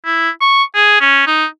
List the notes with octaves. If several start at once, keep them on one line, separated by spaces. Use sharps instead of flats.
E4
C#6
G#4
C#4
D#4